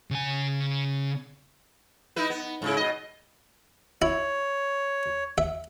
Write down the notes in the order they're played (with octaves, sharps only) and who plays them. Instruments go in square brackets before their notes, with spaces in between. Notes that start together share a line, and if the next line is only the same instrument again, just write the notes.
[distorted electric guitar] C#3 G#5
[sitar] D#4 E4 B4
B3
G#2 C#3 E4
B2 D#5
[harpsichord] E4 [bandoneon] C#5
[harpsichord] E5